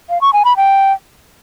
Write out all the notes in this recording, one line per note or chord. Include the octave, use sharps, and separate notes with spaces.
F5
C#6
G#5
B5
G5